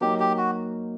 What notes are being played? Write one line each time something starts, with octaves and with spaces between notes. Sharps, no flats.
F#3 A#3 D#4 G4
G4
F#4